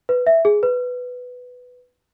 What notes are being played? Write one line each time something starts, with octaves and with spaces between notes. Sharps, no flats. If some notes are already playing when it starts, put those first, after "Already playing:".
B4
E5
G#4
B4